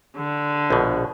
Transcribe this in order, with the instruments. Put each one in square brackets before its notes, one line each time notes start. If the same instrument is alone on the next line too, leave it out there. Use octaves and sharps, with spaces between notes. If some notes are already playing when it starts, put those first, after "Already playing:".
[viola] D3
[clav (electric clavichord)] A#1 B2